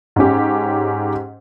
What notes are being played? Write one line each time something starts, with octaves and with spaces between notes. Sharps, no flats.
G#2 C#4 G4